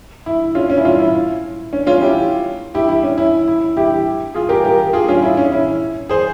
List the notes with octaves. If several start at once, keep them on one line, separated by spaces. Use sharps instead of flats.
E4
C#4 F4
C#4
E4
C#4 F4
E4
C#4
C#4 F4
E4 G4
E4 G4
E4
C#4
E4
E4
E4 G4
F4 G#4
G4 A#4
G4 A#4
F4 G#4
C#4 F4
E4
C#4
E4
G#4 C5